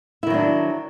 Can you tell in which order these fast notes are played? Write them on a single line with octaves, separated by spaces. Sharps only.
E4 D#3 F#3 D4